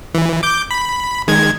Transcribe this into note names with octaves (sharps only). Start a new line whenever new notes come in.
E3
D6 G6
B5
D#3 G#3 G#6